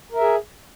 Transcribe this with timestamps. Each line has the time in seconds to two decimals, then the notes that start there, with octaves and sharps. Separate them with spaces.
0.12 A#4
0.16 E5
0.21 G#4